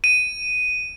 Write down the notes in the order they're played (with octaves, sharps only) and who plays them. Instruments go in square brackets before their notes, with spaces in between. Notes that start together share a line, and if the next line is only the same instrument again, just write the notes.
[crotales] D#7